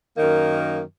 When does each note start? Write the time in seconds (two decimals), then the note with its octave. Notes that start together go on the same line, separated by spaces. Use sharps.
0.16 F#2 D#3 A#3